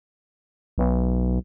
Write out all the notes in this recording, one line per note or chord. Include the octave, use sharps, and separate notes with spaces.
B1